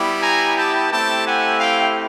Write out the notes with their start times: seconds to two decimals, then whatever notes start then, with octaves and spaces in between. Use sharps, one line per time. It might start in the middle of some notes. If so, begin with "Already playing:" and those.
Already playing: G3 B3 E4 G4
0.22 G#5 A#5
0.56 G5 A5
0.91 A3 C4 E4 G4 G5 A5
1.26 F#5 G#5
1.60 F5 G5